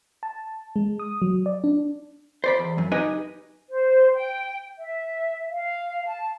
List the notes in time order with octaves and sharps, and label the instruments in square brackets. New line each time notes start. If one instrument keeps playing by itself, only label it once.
[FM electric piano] A5
G#3
D#6
F#3
D5
D4
[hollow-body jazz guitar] C5 D5 B5
E2
F#2
D#4 G4 B4 D#5 G#5
[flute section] C5
G5
E5
F5
A5